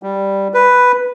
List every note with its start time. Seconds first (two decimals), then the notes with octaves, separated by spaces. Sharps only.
0.03 G3
0.54 B4